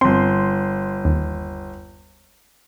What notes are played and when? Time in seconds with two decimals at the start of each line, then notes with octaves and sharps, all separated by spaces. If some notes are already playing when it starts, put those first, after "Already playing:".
0.01 G1 C4 C6
1.05 D#2